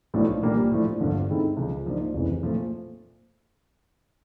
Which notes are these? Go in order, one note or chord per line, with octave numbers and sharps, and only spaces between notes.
B1 A2 F3 A3 D4
A#1 A#2 G3 A#3 D4
A2 F3 A3 D4
G1 G2 D3 F3
D#3 G#3 C4 E4 A4
C#2 C#3 F3
G#2 F3 A#3 D4
F1 F2 C#3 E3
A#2 F3 A3